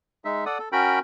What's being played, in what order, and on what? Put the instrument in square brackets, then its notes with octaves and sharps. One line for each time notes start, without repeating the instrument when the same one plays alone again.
[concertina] G#3 D#4 E5
A4 D5 F#5 D#6
A4
C#4 F#4 A#4 G5 B5